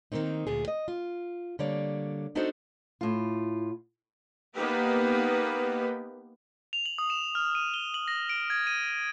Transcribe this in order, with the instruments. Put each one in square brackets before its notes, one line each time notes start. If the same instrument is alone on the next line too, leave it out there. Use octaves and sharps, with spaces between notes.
[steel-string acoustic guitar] D#3 F3 A#3 C4 D#4
D2 A#2 G#4
D#5
F4
D3 G3 A#3 C#5 D5
B3 D4 D#4 F#4 A4 C5
A2 F4
[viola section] A#3 B3 D#4 G4 B4
[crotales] F7
F#7
D#6
E7
F6
D#7
G7
F#7
A#6
D7
G#6
D#7